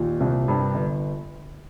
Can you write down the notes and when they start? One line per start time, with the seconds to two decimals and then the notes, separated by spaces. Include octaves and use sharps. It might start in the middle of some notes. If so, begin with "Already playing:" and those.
Already playing: D#2 A#2
0.20 C2
0.48 G2
0.74 G1